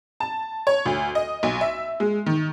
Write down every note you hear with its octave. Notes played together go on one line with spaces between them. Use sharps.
A5
C#5
D2
D#5
B1
E5
G#3
D#3